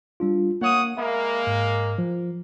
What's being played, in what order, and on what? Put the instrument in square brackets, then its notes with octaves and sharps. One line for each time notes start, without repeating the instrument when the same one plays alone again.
[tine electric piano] G3 D4 F4
[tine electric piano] A#3 [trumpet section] C#5 F#5 D#6
[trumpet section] G#3 A#3 [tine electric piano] E5 B5
[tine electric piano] G#2
F3